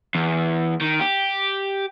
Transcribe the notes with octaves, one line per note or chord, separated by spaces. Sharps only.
E2
D#3
G4